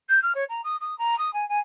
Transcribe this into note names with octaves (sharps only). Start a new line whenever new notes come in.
G6
F6
C#5
A#5
D#6
D#6
A#5
D#6
G#5
G#5